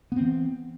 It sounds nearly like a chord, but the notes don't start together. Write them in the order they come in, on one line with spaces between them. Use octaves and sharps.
B3 C4 E3